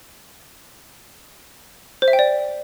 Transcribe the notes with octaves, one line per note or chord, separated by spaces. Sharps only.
C5
E5
G5
D5